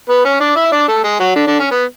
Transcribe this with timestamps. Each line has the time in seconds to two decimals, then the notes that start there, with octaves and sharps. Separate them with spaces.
0.09 B3 B4
0.25 C#4 C#5
0.40 D4 D5
0.56 E4 E5
0.72 D4 D5
0.88 A3 A4
1.04 G#3 G#4
1.20 F#3 F#4
1.36 D3 D4
1.47 D3 D4
1.59 C#4
1.71 B3